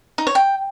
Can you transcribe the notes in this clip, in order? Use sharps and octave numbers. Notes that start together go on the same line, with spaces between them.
D#4
C#5
G5